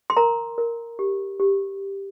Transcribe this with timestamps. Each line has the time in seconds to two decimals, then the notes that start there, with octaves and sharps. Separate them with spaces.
0.10 C6
0.17 A#4 A#5
0.58 A#4
0.99 G4
1.40 G4